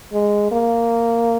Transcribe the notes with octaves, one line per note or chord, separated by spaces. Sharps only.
G#3
A#3